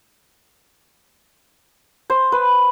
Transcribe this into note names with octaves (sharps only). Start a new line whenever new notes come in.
C5
B4